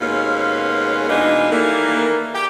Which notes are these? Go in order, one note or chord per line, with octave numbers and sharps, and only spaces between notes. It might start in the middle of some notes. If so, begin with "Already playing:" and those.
D#2 B2 G#3 C#4 C5 F5
B2 E3 G#3 A#3 D4 D#4
D#3 E3 G3 A3 A#3
G4